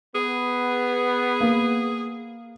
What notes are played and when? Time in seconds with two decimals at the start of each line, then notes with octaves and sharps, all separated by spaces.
0.15 B3 G#4
1.41 A#3